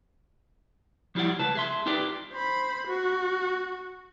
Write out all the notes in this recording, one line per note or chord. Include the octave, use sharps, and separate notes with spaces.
F3 G3 E4 F4 D5 F#5
C#2 B4 A5
G#4 E5 C6
D#4 F4 G4 B4 D5
C5 B5
F#4